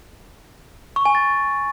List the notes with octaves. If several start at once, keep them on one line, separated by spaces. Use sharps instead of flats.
C#6
G#5
A6